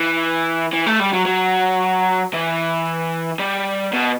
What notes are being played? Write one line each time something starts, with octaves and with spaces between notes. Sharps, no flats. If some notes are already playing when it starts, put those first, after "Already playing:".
Already playing: E3
E3
A3
G3
F#3
F#3
E3
G3
B2